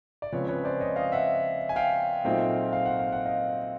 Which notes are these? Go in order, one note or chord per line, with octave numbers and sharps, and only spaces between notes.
D5
C#3 F3 G#3 C4 B4 C#5
B4 C#5
C5 D5
C#5 D#5
D#5 F5
E5 F#5
G#5
F5 G5
A#2 F#3 A3 C4 D#4
F5
F#5
F5
F#5
D#5 F5